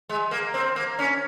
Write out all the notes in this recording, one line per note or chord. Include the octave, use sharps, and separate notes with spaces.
G#3
A#3
C4
A#3
C#4